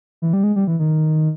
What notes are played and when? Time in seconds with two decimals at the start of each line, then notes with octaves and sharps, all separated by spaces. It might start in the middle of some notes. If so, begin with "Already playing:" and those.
0.22 E3
0.33 G3
0.44 G#3
0.56 G3
0.67 E3
0.79 D#3